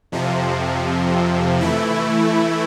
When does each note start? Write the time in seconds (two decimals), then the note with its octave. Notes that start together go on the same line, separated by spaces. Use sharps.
0.12 F2 C3 F3
1.61 E3 A3 E4